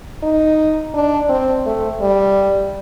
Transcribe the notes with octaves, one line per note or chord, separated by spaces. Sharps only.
D#4
D4
C4
A3
G3